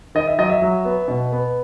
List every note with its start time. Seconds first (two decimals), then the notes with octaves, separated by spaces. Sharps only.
0.15 D#3 D#5
0.27 E5
0.38 F#3 D#5
0.50 E5
0.62 F#3
0.85 B3
1.08 B2
1.32 B3